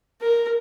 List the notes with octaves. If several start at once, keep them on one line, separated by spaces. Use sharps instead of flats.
A#4